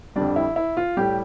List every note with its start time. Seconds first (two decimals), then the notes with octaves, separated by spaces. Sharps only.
0.16 F2 D3 G3 D4
0.36 E4
0.56 E4
0.77 F4
0.97 A2 G3 G4